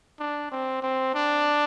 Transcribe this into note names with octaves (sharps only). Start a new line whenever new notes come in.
D4
C4
C4
D4